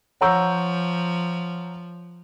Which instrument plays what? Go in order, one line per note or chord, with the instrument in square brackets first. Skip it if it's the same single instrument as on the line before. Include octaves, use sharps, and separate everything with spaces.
[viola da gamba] F3 [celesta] C#5 C#6 G6 [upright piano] F#5 A#5 E6